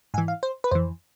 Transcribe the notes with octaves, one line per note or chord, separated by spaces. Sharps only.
G#2 E3 G#5
F5
C5
B4
F2 E3 C5